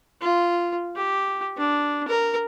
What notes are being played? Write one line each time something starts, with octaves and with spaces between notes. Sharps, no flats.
F4
G4
D4
A#4